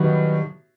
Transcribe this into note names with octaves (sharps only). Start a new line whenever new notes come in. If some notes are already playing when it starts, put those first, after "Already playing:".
Already playing: A2 D#3 F#3 G3 B3 D#4 F#4